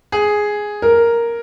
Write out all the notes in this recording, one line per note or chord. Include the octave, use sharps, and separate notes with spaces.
G#4
A#4